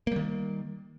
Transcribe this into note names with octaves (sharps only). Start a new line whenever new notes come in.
D#3 G3 A#3